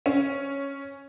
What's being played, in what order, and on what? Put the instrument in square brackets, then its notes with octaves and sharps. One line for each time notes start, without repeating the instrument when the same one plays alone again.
[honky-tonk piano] C#4